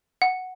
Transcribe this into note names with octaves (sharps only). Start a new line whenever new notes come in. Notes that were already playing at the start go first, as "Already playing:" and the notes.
F#5